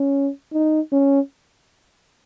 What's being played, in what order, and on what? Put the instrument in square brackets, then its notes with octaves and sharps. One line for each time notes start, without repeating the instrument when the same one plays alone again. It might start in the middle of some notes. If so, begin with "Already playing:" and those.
Already playing: [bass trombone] C#4
D#4
C#4